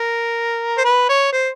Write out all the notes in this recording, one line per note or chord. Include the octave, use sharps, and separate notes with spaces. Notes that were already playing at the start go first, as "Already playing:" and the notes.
Already playing: A#4
C5
B4
C#5
C5